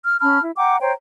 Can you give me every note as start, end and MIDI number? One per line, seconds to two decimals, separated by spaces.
0.05 0.20 89
0.21 0.40 61
0.21 0.40 81
0.21 0.40 83
0.21 0.40 89
0.42 0.51 64
0.57 0.77 78
0.57 0.77 79
0.57 0.77 82
0.57 0.77 86
0.81 0.92 72
0.81 0.92 73
0.81 0.92 79
0.81 0.92 82